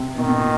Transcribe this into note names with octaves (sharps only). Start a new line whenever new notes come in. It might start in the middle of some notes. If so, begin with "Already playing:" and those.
Already playing: C3
B2 D#3
B2
A#2